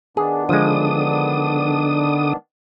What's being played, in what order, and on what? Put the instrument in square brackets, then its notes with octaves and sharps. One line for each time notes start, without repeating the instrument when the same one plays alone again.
[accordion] D#3 B3 D4 [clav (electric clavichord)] G#4
[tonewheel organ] D3 D#6 [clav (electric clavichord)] F3 G#3